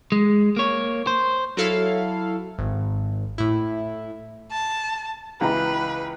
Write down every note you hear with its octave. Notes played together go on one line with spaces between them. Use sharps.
G#3
A#3 C#5
C5
F#3 E4 A4 F5
G#1
A2 E4
A5
C#2 E3 B4 A#5